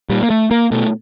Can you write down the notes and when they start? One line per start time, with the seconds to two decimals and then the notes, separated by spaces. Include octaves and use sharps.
0.09 A#2 G3
0.23 A#3
0.30 A3
0.51 A#3
0.71 B2 A3